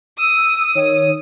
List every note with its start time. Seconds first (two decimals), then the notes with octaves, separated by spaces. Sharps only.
0.18 D#6 E6
0.75 D#3 C#5